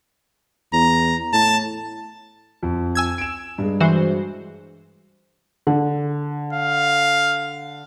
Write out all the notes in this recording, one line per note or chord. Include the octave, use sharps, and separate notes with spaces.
E2 A#5
A2 A5
F2
G#5 E6 G#6
D7 E7
G2 G#3
E3 F#4 C5
D3
F5